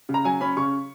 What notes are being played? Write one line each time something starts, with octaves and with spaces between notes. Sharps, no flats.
C#3
A#5
F#3 G#5
C#4 B5
C#3 C#6